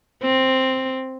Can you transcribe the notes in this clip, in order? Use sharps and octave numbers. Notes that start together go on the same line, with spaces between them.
C4